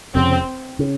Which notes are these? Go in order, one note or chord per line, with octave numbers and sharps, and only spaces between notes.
F1 F2 C#3 C4
C#3